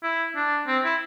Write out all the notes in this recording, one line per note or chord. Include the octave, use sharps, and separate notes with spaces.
E4
D4
C4
E4